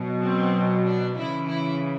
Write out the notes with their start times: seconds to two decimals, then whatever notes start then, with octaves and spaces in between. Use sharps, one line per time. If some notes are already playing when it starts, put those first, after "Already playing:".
Already playing: B2 F#3
0.21 C4
0.85 D4
1.16 C#3 E3 E4
1.48 E4